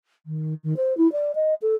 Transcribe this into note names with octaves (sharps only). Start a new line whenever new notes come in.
D#3
D#3
C5
E4
D5
D#5
A4